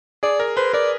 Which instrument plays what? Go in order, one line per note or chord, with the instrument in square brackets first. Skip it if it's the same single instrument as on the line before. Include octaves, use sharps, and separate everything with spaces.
[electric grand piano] G#4 [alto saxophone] D5
[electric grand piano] A#4
[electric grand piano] B4 [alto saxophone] C5
[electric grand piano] A#4 [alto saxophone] D5